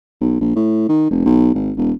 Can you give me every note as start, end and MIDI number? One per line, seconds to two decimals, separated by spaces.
0.21 0.36 35
0.40 0.54 34
0.56 0.88 45
0.88 1.07 51
1.10 1.23 29
1.25 1.53 35
1.54 1.71 32
1.76 1.92 28